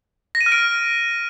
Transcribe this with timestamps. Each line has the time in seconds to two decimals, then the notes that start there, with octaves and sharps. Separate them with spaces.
0.35 A#6
0.41 D#7
0.46 F6
0.52 D7